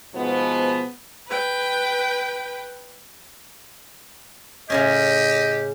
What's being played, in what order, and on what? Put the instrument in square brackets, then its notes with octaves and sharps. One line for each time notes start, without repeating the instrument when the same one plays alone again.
[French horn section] G#2 B2 F3 B3
[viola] B4 G5
[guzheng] A2 C#3 C#4 [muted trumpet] G4 [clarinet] D#5